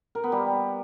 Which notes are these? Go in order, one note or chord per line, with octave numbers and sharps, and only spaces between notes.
A#4
B3
G3